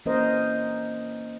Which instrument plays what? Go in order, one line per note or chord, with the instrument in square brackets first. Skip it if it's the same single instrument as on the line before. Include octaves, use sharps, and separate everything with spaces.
[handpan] E3 A#3 C#4 A#4 C5 D#5